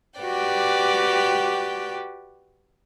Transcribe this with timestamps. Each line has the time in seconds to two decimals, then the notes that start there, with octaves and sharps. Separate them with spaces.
0.20 F#4 G4 B4 D5 G5